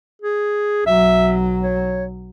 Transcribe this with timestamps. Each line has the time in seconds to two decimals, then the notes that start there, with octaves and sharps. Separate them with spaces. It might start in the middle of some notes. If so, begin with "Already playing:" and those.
0.22 G#4
0.87 B1 F#3 E5
1.63 C#5